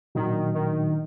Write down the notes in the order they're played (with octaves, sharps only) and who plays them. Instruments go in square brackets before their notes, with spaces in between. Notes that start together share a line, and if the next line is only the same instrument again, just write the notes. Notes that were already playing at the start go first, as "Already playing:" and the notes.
[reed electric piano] A#2 F#3 D4 F#4 [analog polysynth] D#3
[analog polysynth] D#3